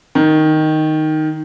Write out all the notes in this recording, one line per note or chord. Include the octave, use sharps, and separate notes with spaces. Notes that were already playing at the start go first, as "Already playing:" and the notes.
D#3